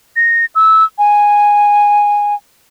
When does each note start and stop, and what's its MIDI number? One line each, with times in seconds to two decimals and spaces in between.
0.16 0.46 94
0.55 0.84 88
0.98 2.35 80